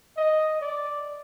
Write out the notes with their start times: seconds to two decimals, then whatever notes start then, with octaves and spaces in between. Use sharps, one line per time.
0.17 D#5
0.61 D5